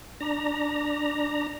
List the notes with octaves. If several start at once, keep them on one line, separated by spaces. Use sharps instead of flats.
D4 A#5